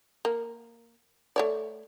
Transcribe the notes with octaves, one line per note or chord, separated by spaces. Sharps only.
A#3
A3 C#5 D5